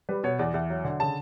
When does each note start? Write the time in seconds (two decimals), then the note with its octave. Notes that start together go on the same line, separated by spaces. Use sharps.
0.09 G3 B4
0.24 B2 C#5
0.39 E2 D5
0.54 E2 E5
0.70 F#3
0.85 D3
1.00 C#3 A5